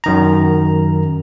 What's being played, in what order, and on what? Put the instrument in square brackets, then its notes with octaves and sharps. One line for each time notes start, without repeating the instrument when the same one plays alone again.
[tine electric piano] F#2 D#3 A#5